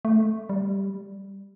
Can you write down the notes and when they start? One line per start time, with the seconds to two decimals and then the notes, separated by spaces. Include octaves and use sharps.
0.05 A3
0.49 G3